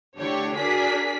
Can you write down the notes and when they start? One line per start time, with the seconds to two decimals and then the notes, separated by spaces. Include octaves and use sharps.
0.17 D3 A3 D4 E4 G4 C#5
0.56 D4 F#4 G#4 A#4 B6